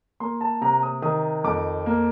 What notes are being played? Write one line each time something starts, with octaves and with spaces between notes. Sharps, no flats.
A#3 C6
A5
C3 A#5
D#6
D#3 D#6
F2 D6
A#3